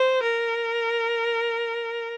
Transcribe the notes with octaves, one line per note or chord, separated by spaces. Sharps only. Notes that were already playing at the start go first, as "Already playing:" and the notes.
Already playing: C5
A#4